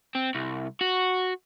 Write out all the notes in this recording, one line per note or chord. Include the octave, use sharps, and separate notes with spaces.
C4
C2
F#4